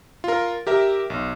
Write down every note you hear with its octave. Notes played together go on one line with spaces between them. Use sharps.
F4 A#4
G4 A#4 E5
B1